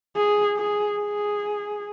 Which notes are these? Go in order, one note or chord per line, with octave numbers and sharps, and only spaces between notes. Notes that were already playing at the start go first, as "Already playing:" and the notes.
G#4
G#4
G#4